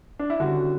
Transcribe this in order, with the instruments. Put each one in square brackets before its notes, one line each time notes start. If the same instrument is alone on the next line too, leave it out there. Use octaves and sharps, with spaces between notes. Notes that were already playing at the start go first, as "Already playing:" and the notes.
[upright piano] D4
E4
D3 G3 C#4 F#4